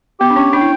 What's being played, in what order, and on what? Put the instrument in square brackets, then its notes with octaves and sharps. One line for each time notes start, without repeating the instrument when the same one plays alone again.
[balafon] B3 [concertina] G4
[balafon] D4
[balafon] C#4 [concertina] C#5
[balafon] D4 [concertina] G5
[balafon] E4